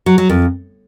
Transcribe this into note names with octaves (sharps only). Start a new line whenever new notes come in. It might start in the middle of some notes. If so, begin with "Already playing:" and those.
F#3
F#3
F2